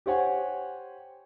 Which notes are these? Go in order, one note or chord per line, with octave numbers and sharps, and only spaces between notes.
G4 C5 C#5 F#5 G#5